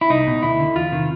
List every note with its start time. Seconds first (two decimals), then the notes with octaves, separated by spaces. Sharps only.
0.01 E4
0.10 C2 D#4
0.27 B2
0.43 D2 E4
0.60 D3
0.76 E2 F4
0.92 C3 D#3